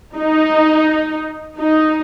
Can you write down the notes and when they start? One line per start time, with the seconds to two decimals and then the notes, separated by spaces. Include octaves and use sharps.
0.16 D#4
1.57 D#4